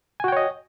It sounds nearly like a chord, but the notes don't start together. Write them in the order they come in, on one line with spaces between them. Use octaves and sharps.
G#5 F#4 G5 C#5 D#5